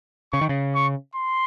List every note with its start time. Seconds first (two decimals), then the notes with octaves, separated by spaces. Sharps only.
0.33 C#3 C#6
0.41 D#3
0.49 C#3
0.75 C#6
1.15 C6